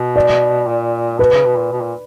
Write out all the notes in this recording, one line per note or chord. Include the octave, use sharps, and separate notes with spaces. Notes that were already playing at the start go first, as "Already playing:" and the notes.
Already playing: B2
D5
A#2
B2 B4
C#3
B2
A#2
B2
A#2